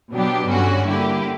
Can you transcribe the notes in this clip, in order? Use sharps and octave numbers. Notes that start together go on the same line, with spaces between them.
B2 F#3 B3 D4 G4
G2 D3 G3 C#4 F#4
D3 A#3 E4 G4